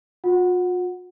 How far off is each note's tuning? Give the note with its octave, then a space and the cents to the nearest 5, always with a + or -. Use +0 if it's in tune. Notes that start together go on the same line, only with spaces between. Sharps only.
F4 +45 F#5 -5